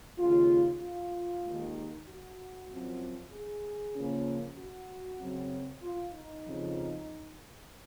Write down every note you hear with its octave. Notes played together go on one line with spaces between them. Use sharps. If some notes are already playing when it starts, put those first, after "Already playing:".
D#2 C#3 G#3 F4
F4
D#2 D#3 G#3
F#4
F#2 F3 C4
G#4
C#3 F3 A#3 C#4
F#4
F#2 C#3 F#3 C4
F4
D#4
F2 C#3 F3